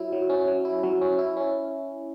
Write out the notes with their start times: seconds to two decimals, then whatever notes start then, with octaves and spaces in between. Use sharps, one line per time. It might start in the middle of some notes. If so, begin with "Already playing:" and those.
Already playing: F#3 E4
0.12 F#3
0.30 C#4
0.48 F#3
0.65 E4
0.83 F#3
1.01 C#4
1.19 E4
1.37 C#4